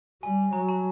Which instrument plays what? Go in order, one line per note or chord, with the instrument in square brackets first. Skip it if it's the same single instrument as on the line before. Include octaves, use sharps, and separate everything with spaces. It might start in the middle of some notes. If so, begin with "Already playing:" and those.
[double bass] G3 [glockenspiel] G#5
[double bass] F#3 [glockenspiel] A#5
[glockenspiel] A5